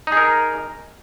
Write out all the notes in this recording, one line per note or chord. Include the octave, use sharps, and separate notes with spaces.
D#4 G#4 A#4